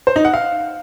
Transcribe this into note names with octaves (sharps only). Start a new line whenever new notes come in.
C5
D#4
F#5
F5